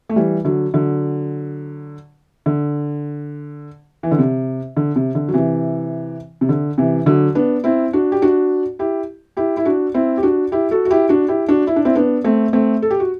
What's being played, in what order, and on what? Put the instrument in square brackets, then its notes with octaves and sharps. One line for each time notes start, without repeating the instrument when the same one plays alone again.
[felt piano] A3
E3 G3
D3 F#3
D3 F#3
D3
E3
D3
C3
D3
C3
D3
F#3
C3 E3
C3
D3
C3 E3
D3 F#3
B3 D4
C4 E4
D4 F#4
G4
D4 F#4
E4 G4
E4 G4
E4
D4 F#4
C4 E4
G4
D4 F#4
E4 G4
F#4 A4
F#4
E4 G4
D4 F#4
E4 G4
D4 F#4
E4
D4
C4 E4
B3 D4
A3 C4
A3 C4
A4
G4
F#4